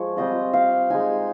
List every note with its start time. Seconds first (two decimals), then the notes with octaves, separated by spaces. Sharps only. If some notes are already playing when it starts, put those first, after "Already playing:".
Already playing: F3 G#3 C#6
0.17 G3 C4 F4 D#5
0.53 F5
0.90 G#3 D#4 G#5